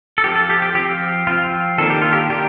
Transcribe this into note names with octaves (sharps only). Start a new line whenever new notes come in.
A4
F3 C4 G4
A4
G4
G4
F3 C4 G4
F3 C4 F4
D#3 A#3 D4 A4
G4
F4
G4
D#3 A#3 D4 G4